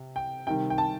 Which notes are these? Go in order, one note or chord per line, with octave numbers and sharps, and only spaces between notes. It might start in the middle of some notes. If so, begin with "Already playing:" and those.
Already playing: C3
G5
C3 D#3 G3 G5
G5
A5